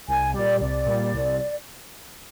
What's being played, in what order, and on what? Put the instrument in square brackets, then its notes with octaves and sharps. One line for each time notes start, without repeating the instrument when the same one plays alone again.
[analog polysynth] C2 [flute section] G#5
[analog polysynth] A#2 G3 [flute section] D5
[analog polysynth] C2 [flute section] D5
[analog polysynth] A#2 G3
C2